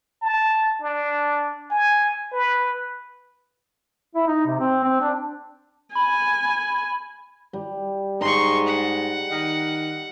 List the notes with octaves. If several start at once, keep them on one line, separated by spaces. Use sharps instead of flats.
A5
D4
G#5
B4
E4
D#4
C3
C4
C4
D4
G#5 B5
G3
G#2 D#4 C6 C#6
F#5
D#3